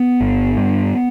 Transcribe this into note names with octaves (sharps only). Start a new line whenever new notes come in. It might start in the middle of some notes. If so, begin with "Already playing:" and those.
Already playing: B3
G1
G2